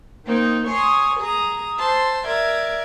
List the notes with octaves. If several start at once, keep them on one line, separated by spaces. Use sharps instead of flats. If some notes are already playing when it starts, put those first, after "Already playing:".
D#3 A#3 C4 D#4
C#5 G#5 C6 D#6
G#4 A#5 D#6
C5 A5 C6 E6
A#4 D5 E5 G#6